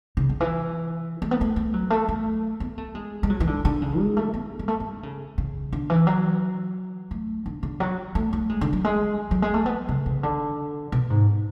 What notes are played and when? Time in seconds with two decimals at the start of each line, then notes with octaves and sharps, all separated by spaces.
0.17 C#3
0.29 C#3
0.41 E3
1.22 A3
1.31 B3
1.41 A3
1.56 A3
1.74 F#3
1.90 A3
2.09 A3
2.60 B3
2.78 A3
2.95 G#3
3.23 G#3
3.30 F#3
3.40 E3
3.47 D3
3.65 D3
3.82 C#3
3.99 G#3
4.17 A3
4.34 B3
4.59 G#3
4.68 A3
4.80 A3
4.92 D3
5.03 C#3
5.38 C#3
5.73 D3
5.90 E3
6.07 F#3
7.11 A3
7.46 D3
7.63 D3
7.80 F#3
8.15 A3
8.33 A3
8.49 G#3
8.61 D3
8.73 F#3
8.85 G#3
9.31 F#3
9.42 G#3
9.54 A3
9.66 B3
9.89 C#3
10.06 C#3
10.23 D3
10.92 B2
11.10 G#2